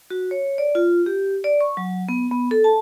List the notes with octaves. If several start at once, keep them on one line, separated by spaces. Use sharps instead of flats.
F#4
C#5
D5
F4
G4
D5
C#6
F#3
B3
B3
A4
A5